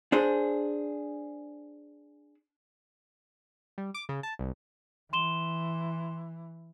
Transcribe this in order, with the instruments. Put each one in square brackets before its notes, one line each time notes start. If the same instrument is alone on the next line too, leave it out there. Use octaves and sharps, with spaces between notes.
[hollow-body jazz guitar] D4 G#4 C5
[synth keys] G3
D6
C#3
A5
C2
[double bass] E3 [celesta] C6 E7 G7